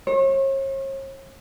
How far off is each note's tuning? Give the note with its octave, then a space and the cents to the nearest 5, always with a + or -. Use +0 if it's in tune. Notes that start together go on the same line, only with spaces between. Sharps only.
C#5 -40